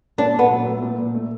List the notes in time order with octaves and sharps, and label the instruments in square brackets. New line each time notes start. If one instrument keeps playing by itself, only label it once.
[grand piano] A#2 [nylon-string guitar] D4
[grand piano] A#2 [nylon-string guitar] B3
[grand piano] F#3
A3
A#2
A#2
A3